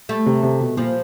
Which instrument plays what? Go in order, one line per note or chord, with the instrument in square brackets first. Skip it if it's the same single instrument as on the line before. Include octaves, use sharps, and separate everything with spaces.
[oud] G3 A3
[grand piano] C3
C3
B2
[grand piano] A#2 [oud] F3 G3